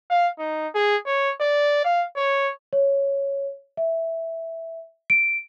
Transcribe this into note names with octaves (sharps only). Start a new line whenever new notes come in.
F5
D#4
G#4
C#5
D5
F5
C#5
C#5
E5
D7